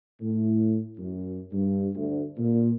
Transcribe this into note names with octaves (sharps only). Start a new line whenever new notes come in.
A2
F#2
G2
D2
A#2